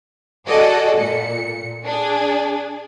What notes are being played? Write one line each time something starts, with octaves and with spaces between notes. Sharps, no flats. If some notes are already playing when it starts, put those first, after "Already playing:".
F#4 G#4 A4 D5 D#5 F#5
A#2 C#7
D4 G#4